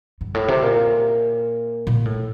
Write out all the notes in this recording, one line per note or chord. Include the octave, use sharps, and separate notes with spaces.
G2
A2
C3
A#2
A#2
A2